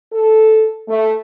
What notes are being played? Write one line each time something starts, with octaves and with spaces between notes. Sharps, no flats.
A4
A3